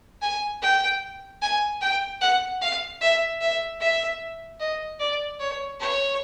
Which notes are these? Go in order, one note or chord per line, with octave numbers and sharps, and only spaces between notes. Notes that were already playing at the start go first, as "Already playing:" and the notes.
G#5
G5
G#5
G5
F#5
F5
E5
E5
E5
D#5
D5
C#5
C#5